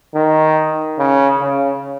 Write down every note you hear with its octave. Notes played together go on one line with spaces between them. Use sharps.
D#3
C#3
C#3